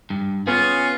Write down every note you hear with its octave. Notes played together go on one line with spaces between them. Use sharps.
G2
B3 C#4 F4 G#4